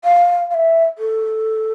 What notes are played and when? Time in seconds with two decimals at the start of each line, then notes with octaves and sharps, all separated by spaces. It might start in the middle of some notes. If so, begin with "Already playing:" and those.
0.04 F5
0.51 F5
0.54 E5
0.98 A4